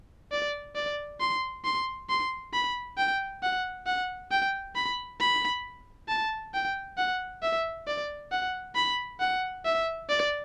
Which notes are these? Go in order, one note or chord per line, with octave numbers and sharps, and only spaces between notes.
D5
D5
C6
C6
C6
B5
G5
F#5
F#5
G5
B5
B5
A5
G5
F#5
E5
D5
F#5
B5
F#5
E5
D5